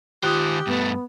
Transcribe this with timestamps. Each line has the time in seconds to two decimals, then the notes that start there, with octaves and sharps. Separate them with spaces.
0.23 D#3 F4 G4 C5 D#6 F#6
0.67 G2 A3 B3